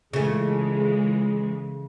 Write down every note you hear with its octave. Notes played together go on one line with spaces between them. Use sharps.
C#2 C#3 E3 G#3 A3